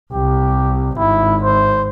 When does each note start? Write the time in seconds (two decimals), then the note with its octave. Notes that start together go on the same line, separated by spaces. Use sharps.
0.13 C2 G4
0.98 G#1 E4
1.43 C5